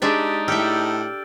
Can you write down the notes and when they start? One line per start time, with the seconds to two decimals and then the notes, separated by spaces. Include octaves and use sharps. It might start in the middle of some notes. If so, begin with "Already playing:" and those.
0.02 G#3 D4 D#4 G4 E5 A6 D7
0.48 A2 G4 A4 E5 E6 F6 G6